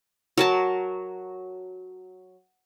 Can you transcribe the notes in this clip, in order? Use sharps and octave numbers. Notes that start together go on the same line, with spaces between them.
F#3 A#4 A5